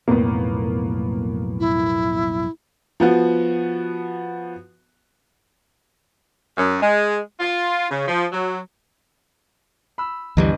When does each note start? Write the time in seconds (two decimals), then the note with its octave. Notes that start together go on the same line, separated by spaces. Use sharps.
0.08 B1 F2 A2 A#3 B3
1.60 E4
3.00 F3 B3 F#4
6.56 F#2
6.82 G#3
7.40 F4
7.90 C#3
8.08 F3
8.32 F#3
9.98 B5 E6
10.37 G1 D2 E3 G3 D#5